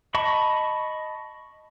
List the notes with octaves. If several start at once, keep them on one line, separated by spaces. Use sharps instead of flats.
D#5 A5 B5 C#6